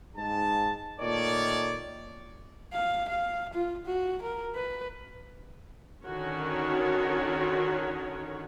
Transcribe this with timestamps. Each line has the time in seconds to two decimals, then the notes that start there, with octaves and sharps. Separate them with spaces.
0.16 G#2 A5
1.00 A#2 D#3 A3 C#5 D5
2.73 F5
3.09 F5
3.54 F4
3.86 F#4
4.22 A#4
4.55 B4
6.04 D3 D#3 C#4 F#4 A#4 C#5